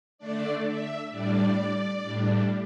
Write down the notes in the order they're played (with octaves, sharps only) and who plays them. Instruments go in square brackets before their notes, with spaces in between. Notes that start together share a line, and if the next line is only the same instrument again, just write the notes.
[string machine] D3 A3 D4 D5
E5
A2 G3 D4 D5
A2 G3 D4